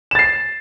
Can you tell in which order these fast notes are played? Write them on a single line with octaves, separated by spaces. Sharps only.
E7 A6 C7